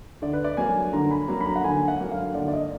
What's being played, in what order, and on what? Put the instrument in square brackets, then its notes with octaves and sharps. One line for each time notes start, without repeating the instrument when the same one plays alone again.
[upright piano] D3 [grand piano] D5
[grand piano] B4
D5
[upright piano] F#3 A#3 [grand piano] G#5
[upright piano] D3 [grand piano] A#5
[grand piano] B5
[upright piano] F#3 A#3 [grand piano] A#5
[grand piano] B5
A#5
F#5
[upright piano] D3 [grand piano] G#5
[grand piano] F#5
[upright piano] F#3 A#3
[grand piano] F5
[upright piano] D3 [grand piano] D5
[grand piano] D5
D#5